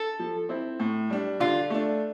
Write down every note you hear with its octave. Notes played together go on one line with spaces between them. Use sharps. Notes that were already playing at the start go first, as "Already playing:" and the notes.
Already playing: A4
F3
C4 E4
A2
G3 D4
D3 F4
A3 D4